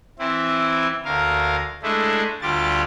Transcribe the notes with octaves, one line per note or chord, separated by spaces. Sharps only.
E3 C4 E4
D2 A#4 F5
G#3 A3 D4 E4
D2 G3 F4 G4 A6